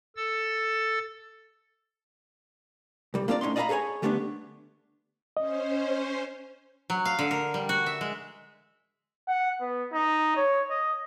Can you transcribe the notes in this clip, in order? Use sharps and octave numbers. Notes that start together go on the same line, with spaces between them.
A4 E6 A6
C2 G3
A#3 C4 D4 F4 G4 D5
A2 C#4 D#4 C6
D5 D#5 F5 G#5 A#5 B5
G#4 A4 C5 C#5 G#5
D3 G3 A3 B3 C#4 D4
C#4 C5 D#5
F#3
F5
D3
A#4
G3
F#4
E5
G#3
F#5
B3
D#4
C#5
D#5